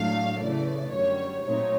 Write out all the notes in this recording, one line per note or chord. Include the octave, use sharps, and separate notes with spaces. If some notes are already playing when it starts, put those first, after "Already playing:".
Already playing: A2 F#3 A3 D4 F5
C#3 E3 A3 D5
F#2 D3 G3 C#5
A#2 F#3 A3 C4 D#4 C#5